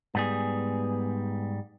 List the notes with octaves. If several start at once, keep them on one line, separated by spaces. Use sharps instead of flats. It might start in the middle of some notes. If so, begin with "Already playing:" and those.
G#2 G3 B3 G#4